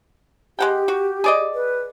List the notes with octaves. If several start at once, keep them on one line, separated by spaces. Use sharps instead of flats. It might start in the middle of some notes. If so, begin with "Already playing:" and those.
G#3 G4 F#5 G5
F#4
G#4 D5 D#5
B4